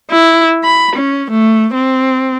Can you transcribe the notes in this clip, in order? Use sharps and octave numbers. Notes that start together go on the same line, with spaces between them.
E4
B5
C#4
A3
C4